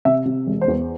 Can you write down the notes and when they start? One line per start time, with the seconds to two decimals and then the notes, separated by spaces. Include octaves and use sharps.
0.05 C3 E5
0.25 C3
0.46 E1
0.61 C5
0.68 E2